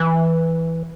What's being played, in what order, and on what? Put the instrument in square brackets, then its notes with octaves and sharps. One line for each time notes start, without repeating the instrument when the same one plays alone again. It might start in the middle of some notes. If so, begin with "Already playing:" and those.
Already playing: [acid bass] E3